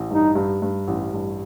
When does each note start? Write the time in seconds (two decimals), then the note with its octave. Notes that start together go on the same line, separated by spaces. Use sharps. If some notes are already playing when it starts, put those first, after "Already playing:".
Already playing: A1
0.10 G2 D#4
0.35 G2
0.62 G2
0.88 A1
1.13 G2